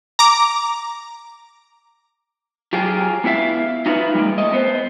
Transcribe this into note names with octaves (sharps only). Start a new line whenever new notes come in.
A#5 D6
F#3 F4 G4 G#4
B3 E4 F#4 E5 F5
D#4 F4 F#4 B4 E5
G3 G#3 A#3
A3 D#5
B3 C5